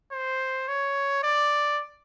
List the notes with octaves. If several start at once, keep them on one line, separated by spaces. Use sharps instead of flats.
C5
C#5
D5